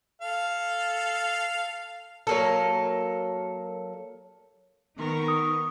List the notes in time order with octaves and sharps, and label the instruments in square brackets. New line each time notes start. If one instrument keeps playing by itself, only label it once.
[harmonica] A4 F5
[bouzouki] F#3 A#3 A4
[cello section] D#3 B3 D#4 [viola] A#4 C#6
[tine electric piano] D#6